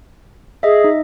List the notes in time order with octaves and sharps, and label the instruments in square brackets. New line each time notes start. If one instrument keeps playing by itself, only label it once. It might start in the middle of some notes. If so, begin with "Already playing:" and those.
[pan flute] G#4 [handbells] D#5 E5
[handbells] D#4